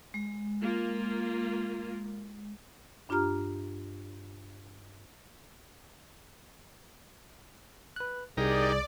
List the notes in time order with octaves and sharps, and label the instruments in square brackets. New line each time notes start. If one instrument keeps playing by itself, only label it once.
[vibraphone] G#3
[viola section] A#3 F4
[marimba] G2 D4 F4 G4 A#5 F6
[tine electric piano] B4 F#6
[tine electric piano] C2 [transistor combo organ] D#4 G4 A#4 [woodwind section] G#4 [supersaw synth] D5